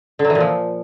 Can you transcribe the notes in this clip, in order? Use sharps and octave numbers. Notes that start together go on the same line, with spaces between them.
D3
F#3
E3
A#2
F3